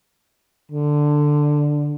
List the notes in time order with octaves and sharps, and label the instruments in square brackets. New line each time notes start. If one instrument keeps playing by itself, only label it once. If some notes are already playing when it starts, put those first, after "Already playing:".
[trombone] D3